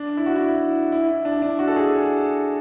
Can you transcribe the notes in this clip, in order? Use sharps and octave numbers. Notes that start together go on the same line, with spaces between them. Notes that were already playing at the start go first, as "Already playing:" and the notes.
Already playing: D4
E4
F#4
E4
E4
E4
D4
D4
F#4
A4
G#4